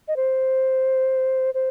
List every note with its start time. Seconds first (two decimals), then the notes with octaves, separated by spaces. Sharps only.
0.08 D#5
0.16 C5
1.54 C5